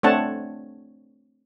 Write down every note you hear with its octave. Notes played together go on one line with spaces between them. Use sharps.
A3 C4 D4 C#5 F#5 A5